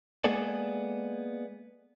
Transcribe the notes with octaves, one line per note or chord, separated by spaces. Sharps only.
G#3 A#3 B3 G#4 A4 D5